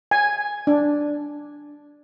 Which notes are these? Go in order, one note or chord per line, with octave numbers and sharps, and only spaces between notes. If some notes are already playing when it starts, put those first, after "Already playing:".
G#5
D4